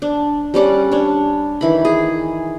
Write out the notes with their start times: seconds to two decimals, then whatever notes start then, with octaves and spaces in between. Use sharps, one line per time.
0.02 D4
0.54 G3 C#4 D5 F#5
0.92 D4 C#5
1.61 D#3 E3 B5
1.85 G#4